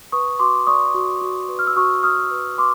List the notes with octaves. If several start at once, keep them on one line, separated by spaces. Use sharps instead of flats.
B4 C#6 D#6
F#4 C6 D6
D5 C#6 D#6
F#4
F#4
B4
F6
E6
F#4 C#6 D#6
F#4 D#6 F6
B4
B4 C6 D6